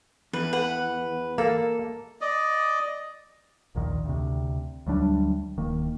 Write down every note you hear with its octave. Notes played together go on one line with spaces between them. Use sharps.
E2 B4
B4 F#5
A#3 A4
D5 D#5
A#1 D#2 A#2 D#3
D2 C3
D2 F#3 G3 D4
D1 D#3 A#3